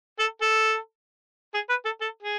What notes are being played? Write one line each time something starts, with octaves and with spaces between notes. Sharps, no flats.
A4
A4
G#4
B4
A4
A4
G#4